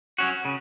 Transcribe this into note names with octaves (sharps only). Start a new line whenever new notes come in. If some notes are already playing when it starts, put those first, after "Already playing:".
F#3 C#4 F#4
C#3